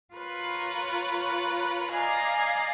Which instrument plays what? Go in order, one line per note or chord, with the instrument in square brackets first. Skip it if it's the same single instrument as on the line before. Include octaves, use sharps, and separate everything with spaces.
[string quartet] F4 A#4 B4 C#5
D5 D#5 F5 G#5 A#5